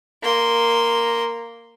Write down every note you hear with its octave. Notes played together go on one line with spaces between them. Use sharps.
A#3 C6